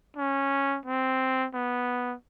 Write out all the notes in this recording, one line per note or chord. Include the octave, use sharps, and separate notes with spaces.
C#4
C4
B3